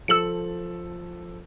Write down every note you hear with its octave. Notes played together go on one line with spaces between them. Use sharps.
F3 A4 E6 C#7 F#7